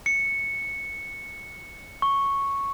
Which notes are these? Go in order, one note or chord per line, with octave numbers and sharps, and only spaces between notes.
C#7
C#6